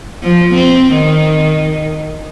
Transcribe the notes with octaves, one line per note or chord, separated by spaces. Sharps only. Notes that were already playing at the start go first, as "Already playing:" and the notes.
F3
C4
D#3